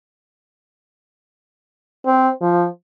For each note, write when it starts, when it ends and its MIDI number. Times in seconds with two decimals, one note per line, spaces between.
2.06 2.29 60
2.41 2.66 53